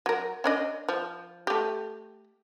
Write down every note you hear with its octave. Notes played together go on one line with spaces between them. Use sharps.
F#3 A#4
C#4 D4 D#5
F3
A3 G4